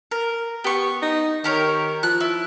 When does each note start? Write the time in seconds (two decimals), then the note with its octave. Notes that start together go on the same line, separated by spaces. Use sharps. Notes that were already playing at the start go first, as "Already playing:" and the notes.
0.11 A#4
0.64 B3 G4 C#6
1.02 D#4
1.44 D#3 G4 A#4 C#5
2.03 F3 F#6
2.20 E4